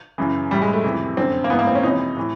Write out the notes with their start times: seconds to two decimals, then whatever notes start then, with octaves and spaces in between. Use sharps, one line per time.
0.18 F#2 C#3 E3
0.51 E3 G3
0.54 A2
0.62 G#3
0.73 A3
0.84 F2 C3 E3
1.17 F#2 D3 C4
1.44 A#3
1.50 G#2 E3 B3
1.59 A#3
1.67 C4
1.75 C#4
1.83 F2 C3 E3 D#4
2.17 A2 E3